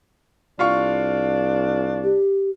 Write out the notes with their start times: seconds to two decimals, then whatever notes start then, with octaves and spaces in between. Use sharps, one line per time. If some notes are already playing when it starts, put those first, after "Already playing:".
0.59 C2 D4 F4 F5 C#6
2.04 G4